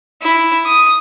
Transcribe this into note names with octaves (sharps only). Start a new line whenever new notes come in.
E4
D#6